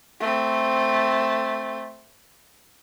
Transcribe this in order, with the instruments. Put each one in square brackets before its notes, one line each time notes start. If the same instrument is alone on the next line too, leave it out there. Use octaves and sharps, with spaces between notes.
[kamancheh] A3 C4